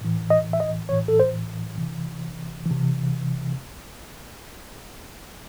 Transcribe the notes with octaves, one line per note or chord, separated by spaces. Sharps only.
A2 E3
D#5
E5
D#5
A2 E3 C#5
A4
C5
C3 E3
C3 E3